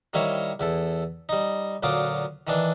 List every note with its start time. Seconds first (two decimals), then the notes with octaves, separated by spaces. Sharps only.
0.13 D#3 G3 A#3 E4 C5 C#5
0.60 E2 E4 A4
1.29 G3 D#4
1.83 D2 A#2 F#3 F4 D6 D#6
2.47 D#3 E3 D4